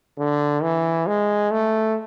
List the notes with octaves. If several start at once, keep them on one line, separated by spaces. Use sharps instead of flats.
D3
E3
G#3
A3